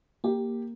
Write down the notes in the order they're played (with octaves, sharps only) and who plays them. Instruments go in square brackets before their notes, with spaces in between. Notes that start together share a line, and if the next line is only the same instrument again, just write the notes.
[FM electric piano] A#3 [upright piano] G4